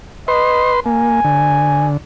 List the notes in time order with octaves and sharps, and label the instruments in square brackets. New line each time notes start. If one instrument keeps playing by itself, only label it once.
[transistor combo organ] B4 C6 [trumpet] D#5
[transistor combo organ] A#3 [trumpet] G#5
[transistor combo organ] D3